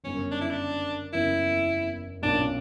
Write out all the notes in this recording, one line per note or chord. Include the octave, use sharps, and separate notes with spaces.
G1 F#2 C#3 C#4
D4
E4
D4
F#1 E2 C#3 E4
B1 A#2 A#3 C#4 D4